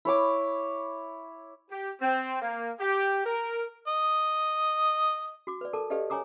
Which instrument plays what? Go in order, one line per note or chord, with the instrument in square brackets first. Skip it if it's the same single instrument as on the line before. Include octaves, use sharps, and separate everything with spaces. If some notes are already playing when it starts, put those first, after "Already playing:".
[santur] E4 C#5 D6
[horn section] G4
C4
A#3
G4
A#4
[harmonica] D#5
[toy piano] F#4 D6
B4 D5
A4 A#4 A5 D6
G4 A4 B4 D5 D#5 F5
C#5 G#5 A#5 D6 D#6